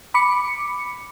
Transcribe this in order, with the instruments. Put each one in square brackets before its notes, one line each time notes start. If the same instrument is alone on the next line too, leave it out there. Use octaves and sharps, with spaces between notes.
[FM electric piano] B5 D6 C#7